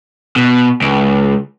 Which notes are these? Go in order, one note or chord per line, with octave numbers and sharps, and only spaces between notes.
B2
C#2